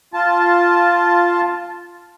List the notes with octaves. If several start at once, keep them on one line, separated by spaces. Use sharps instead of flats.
F4 A5